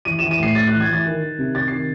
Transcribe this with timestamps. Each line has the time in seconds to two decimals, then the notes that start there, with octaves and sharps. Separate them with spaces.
0.05 E3 D#7
0.19 E3 E7
0.31 D#7
0.40 A2 C7
0.55 A2 A6
0.68 E3 F#6
0.80 G#6
0.89 E3 A6
1.05 D#3
1.22 D#3
1.38 C3
1.55 C3 A6
1.68 D#3 C7